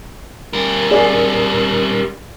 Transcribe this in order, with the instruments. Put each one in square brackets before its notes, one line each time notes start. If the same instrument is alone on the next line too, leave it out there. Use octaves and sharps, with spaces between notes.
[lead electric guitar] G3 A#4
[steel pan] G#4 D5 D#5